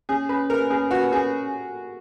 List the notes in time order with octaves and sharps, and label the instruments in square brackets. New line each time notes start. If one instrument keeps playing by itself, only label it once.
[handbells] C#4 [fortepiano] G#4
[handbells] C#4 [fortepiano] B4
[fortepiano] A#4 [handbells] B4
[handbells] C#4 [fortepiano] G#4
[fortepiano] F#4 [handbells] B4
[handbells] C#4 [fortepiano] G#4